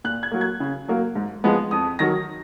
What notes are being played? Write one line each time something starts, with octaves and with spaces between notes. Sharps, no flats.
A#2 F#6
G#6
F#3 A#3
G#6
C#3
F#3 A#3
G#2
F3 G#3 B3
F2 D#6
D#3 F#3 A#6